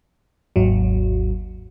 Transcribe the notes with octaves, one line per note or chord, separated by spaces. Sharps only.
G#1 D#2 F#3